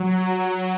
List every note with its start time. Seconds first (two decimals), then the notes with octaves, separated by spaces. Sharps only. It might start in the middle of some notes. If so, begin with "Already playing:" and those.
Already playing: F#3